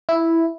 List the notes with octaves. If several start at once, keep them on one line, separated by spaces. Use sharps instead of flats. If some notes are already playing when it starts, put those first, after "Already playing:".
E4